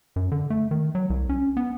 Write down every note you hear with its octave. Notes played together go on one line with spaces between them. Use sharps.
F#2
D3
A3
D#3
F#3
C2
C#4
B3